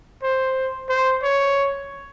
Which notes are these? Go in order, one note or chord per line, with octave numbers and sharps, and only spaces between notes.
C5
C5
C#5